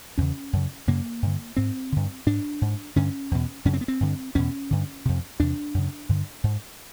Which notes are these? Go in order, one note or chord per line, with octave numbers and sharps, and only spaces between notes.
E2 C#3 C#4
F#2 C#3
F#2 C#3 A#3
G2 D3
G#2 C4
G2 D3
G#2 D4
G#2
G2 D3 C#4
E2 B2
F#2 C#3 C#4
C4
B3
C4
G2 D3
E2 B2 C#4
G2 D3
F2 C3
E2 C3 D4
F#2 C#3
G2 D3
G#2